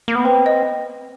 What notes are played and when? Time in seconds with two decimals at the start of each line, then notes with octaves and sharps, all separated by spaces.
0.08 A#3
0.15 B3
0.25 C4 B4
0.46 D#5